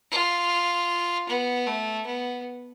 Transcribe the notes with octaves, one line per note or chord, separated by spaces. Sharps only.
F4
B3
A3
B3